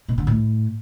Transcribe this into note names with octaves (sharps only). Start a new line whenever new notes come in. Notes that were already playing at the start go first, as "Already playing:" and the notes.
B2
D3
A2